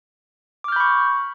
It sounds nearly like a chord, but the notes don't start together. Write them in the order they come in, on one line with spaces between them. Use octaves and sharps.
D6 F6 G6 B5 C#6